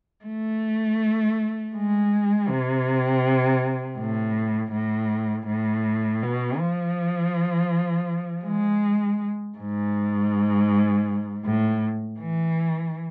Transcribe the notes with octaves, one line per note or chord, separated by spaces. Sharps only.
A3
G#3
C3
A2
A2
A2
B2
F3
G#3
G#2
A2
E3